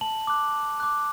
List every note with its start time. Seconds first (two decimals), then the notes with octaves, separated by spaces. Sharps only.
0.01 A5 F#7
0.27 D6 F#6
0.54 A5
0.80 D6 F#6